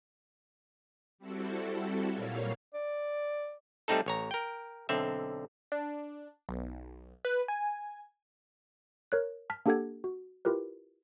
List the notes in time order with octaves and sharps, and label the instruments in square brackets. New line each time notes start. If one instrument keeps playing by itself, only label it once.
[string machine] G3 C4 E4 F#4 A4
A#2 F#3 G3 A#3 C#5 F5
[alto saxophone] D5
[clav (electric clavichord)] G3 A3 C4 D#4 A4
A1 C#5 A#5
A#4 G5
B1 D3 C4 E5
[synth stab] D4
B1
B4
G#5
[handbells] A#4 C#5 F#6
A5 F6 B6
A#3 D4 G4 A4 F#5 G#6
F#4
E4 F4 G4 A#4 B4